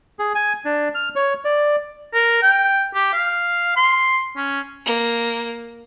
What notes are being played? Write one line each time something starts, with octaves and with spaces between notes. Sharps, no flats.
G#4
G#5
D4
F6
C#5
D5
A#4
G5
G4
F5
C6
C#4
A#3